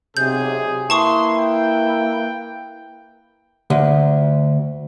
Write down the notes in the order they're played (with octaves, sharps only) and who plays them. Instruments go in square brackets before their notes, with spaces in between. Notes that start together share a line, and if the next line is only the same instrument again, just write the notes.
[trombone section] B1 C3 [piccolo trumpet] G#4 [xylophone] G6
[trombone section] A#3 E4 B4 [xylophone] A5 C#6 D#6 [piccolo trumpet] C6
[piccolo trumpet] G5
[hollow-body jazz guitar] D2